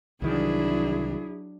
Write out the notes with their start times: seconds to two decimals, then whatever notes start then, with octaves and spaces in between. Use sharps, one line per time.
0.22 C2 D#3 E3 F#3 D4 E4 G#4